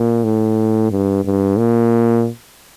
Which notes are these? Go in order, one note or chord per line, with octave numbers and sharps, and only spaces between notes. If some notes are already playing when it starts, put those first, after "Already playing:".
Already playing: A#2
A2
G2
G2
A#2